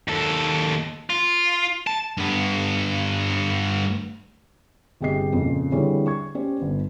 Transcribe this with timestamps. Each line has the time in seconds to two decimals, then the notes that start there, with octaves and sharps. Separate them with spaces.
0.08 D#2 A4
1.10 F4
1.87 A5
2.17 G2 B3
5.01 G1 C3 G4 G#4 D#5 C7
5.33 F2 A#2 C#3
5.72 D3 E3 G3 C4 G#4 C#5
6.07 C#6 G#6
6.35 C#4 G4 C5 D5
6.58 G1 B3